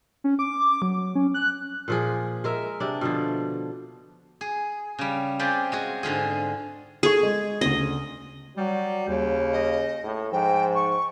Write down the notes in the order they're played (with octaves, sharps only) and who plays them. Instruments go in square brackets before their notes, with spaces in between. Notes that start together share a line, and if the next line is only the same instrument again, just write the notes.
[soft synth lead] C#4
D6
F#3
C#4
F#6
[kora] A#2 F3 G#4
G#3 A#4 E5
C3 D4
B2 D3 F3
[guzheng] G#4
C#3 G3
C4 F4 G4 G#4 D5
G#3 F#4 G#4
G#2 D3 F4 G#4
[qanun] G#4 [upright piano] A4 C#6
[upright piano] G#3
[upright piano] D2 C#3 [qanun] D#5
[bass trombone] F#3 [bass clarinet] G3
[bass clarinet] D#2 [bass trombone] C#3
[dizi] D#5
[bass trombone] A2
[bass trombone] G#2 [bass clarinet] F3 [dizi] G5
[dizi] C#6